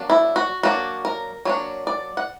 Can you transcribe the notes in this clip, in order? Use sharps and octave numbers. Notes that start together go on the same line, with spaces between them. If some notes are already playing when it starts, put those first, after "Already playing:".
Already playing: F#3 A#3 D4
E4
F#4
F#3 A#3 D4 F#4
A#4
F#3 A#3 D4 C#5
D5
F#5